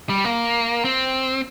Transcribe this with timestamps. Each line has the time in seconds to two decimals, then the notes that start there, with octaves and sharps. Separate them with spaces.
0.09 G3
0.25 A#3
0.85 C4